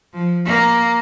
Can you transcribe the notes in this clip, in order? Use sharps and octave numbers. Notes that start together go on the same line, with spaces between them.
F3
A#3